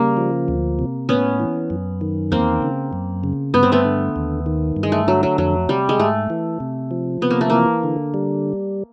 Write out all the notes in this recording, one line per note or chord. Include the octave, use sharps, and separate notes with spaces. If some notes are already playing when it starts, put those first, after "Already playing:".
Already playing: C#3 G3 A#3
F3
D2
C3
A2 B3 C#4
E3
F#2
D#3
E2 A#3 C4
C#3
F#2
C#3
G2 B3
C4
A3 B3
D3
D#2
D#3
G2
G#3
A3
D3 F#3
F#3
F2 F#3
C3 G3
G#3
G#2 A3
E3
C3
F3
C3 B3
A#3
A3
E3 A#3
D3
G3